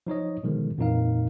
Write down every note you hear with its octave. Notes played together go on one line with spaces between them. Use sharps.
F3 D#4 C#5 D#5
B2 D3 D#3 F3 G#3
F2 A#2 E3 D#4 A#4 F5